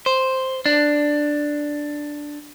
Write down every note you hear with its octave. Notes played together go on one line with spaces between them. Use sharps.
C5
D4